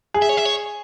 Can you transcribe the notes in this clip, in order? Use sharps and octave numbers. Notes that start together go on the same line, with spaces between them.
G#4
E5
C#5
E5
C#5